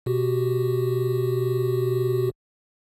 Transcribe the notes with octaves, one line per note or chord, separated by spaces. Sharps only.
B2 F#4 G4